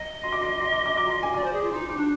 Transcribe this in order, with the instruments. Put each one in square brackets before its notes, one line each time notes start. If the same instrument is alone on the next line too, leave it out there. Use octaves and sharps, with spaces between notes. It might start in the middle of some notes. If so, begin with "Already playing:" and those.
Already playing: [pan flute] D#5 [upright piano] A#5
[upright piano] C6
D6
C6
C6
D6
D6
D6
A#5
C6
G#5
[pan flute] D5 [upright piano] D6
[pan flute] C5
G#4
F4
[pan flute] D#4 [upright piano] C6
[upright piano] D6
[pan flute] D4